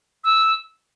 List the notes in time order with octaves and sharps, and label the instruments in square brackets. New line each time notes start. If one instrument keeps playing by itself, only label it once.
[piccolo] E6